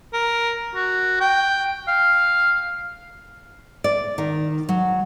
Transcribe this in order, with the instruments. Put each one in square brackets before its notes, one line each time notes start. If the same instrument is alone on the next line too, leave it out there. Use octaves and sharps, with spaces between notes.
[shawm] A#4
F#4
G5
F5
[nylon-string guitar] D5
D#3
F#3